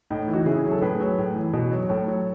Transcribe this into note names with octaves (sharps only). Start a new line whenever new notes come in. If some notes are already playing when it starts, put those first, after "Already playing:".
A2 D#4
D#4
E3
D#4 F#4
C#3 E4 G#4
F#3
A4
A2 G#4 B4
F#3
A2
E3
B2
F#3
A2 A4 C#5
F#3